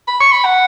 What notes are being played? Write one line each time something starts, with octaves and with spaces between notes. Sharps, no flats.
B5
C#6
B5
F#5